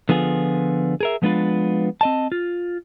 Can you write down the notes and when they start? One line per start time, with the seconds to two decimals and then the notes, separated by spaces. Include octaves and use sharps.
0.09 D3 F3 B3 F4 G#4
1.01 G#4 A#4 E5
1.22 F3 G#3 B3 D4 F4 B4
2.01 C4 D#5 A5
2.32 F4